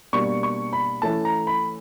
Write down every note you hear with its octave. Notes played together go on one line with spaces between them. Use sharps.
B2 G3 A#3 D4 C#6
C#6
B5
E3 A3 C#4 A5
A#5
B5